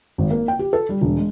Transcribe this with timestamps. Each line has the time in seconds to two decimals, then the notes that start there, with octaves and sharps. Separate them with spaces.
0.18 G#1
0.31 A#3
0.48 G5
0.59 G4
0.73 A4
0.89 G3
1.01 E1
1.17 G#3